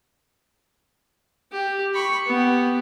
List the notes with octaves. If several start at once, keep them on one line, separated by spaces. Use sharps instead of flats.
G4
B5 C#6
B3 G4